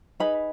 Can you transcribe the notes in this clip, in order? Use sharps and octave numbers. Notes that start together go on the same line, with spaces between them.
D#4 G#4 B4 B5